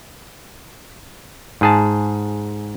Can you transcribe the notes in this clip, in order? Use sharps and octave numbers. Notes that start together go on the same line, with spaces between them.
G#2 G#4 A5